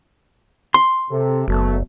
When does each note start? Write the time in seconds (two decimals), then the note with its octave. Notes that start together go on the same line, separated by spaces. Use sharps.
0.74 C6
1.11 C3 A4
1.48 F#1 B2 F#3 A3